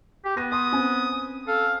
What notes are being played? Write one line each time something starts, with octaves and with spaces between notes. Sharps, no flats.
G4
B3 A#6 D#7
C6 D#6
C4 C#4 G#5
A4 F5